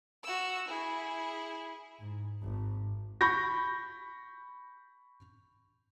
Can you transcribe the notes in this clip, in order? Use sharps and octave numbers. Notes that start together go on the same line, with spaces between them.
F#4 E6
E4 G#4
G#2
G#1
B5 C#6 G6 A#6